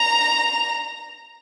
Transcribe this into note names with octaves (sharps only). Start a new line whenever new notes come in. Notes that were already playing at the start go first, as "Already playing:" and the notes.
Already playing: A#5